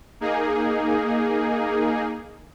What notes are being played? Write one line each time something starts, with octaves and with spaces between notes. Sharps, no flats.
A#3 D#4 G#4